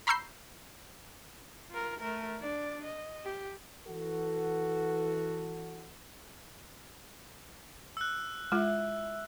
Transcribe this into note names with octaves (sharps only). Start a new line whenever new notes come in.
A#5 B5 C#6 E6 G6 C7
F4 A#4
A3 A#4
D4 D5
D#5
G4
E3 F#4 A4
E6 F#6
G#3 E4 F4